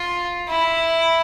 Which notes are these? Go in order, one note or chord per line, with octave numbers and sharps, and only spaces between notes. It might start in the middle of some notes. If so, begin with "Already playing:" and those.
Already playing: F4
E4